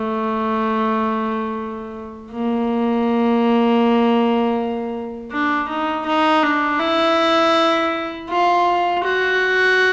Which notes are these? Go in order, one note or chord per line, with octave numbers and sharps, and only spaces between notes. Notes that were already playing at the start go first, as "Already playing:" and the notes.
Already playing: A3
A#3
D4
D#4
D#4
D4
E4
F4
F#4